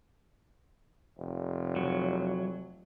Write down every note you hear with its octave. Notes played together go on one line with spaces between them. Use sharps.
F1
F#3